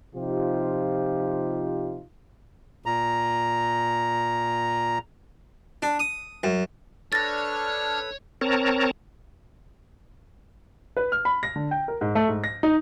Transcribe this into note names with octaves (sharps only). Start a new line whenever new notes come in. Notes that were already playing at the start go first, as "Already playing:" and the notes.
C3 F3 D#4 F4 G4
A#2 A#5
D4
D#6
F#2
D4 A4 B4 C#5 F6 A6 A#6
C4 A#4 C#5 A5 A#5
B4
F6
B5
A#6
D3
G5
A#4
G#2
A3
G#2
A#6
D#4